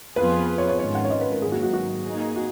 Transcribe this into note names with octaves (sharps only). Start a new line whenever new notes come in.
F2 F3 B3 F4 G#4 B4
C#5
C#5
G#2 D#3 G#3 C#4 F4 C#5
F#5
C#5
D#5
B4
A#4
G#2 D#3 F#3 A#3 G#4
F#4
F#4
F#4
A#3 D#4 G#4
F#4